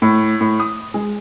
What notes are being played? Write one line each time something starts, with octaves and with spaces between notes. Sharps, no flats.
A2
A2
D#6
G#3